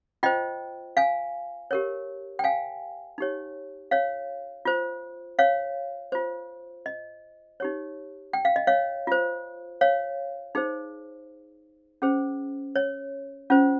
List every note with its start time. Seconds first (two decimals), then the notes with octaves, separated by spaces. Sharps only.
0.23 F4 C5 D#5 G5
0.97 F5 G#5
1.71 G4 A#4 C#5
2.39 G5
2.44 F5 G#5
3.18 D#4 G4 C#5
3.91 C#5 F5
4.65 F4 C5
5.39 C#5 F5
6.12 F4 C5
6.86 D#5
7.60 D#4 G4 C#5
8.33 G5
8.45 F5
8.56 D#5
8.67 C#5 F5
9.07 F4 C5
9.81 C#5 F5
10.55 D#4 G#4 C5
12.02 C#4 G#4 C5
12.76 C#5
13.50 C#4 F4 C5